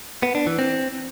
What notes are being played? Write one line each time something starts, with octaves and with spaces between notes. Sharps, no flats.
B3
D4
E3
C4